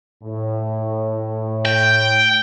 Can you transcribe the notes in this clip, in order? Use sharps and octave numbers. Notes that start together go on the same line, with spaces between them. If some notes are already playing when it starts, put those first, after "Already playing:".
A2
G5